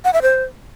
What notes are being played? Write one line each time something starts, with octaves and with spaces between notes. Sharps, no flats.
F#5
E5
C5